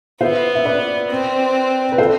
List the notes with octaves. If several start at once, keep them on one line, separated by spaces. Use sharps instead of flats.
B3 C5 E5
E5
B4 D5
C4
B4
A4 C5